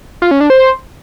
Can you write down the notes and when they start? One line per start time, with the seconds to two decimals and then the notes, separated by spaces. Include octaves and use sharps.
0.22 F4
0.31 C#4
0.41 D4
0.50 C5